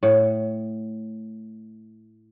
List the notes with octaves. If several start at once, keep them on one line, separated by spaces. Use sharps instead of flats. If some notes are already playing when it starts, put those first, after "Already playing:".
A2 F#5